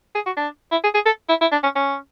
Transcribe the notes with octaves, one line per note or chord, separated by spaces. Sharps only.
G#4
F#4
D4
E4
G#4
G#4
A4
E4
E4
D4
C#4
C#4